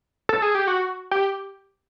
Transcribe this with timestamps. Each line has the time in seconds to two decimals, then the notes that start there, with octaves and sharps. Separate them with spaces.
0.29 A4
0.42 G#4
0.55 G4
0.67 F#4
1.11 G4